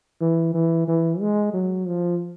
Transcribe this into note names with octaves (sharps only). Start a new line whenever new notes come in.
E3
E3
E3
G#3
F#3
F3